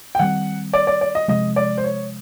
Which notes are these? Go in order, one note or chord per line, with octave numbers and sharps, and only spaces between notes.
G5
D#3 G3 C4 F#5
D5
D5
D5
D#5
C3 F3 G#3 D#5
D5
C5
C#5